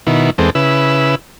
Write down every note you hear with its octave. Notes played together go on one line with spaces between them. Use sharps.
B2 D#3 E4
E2 G#3 C4 A4
C#3 E4 B4 E6